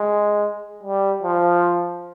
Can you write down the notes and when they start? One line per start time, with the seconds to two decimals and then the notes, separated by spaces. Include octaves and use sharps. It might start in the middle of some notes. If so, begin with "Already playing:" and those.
Already playing: G#3
0.83 G3
1.23 F3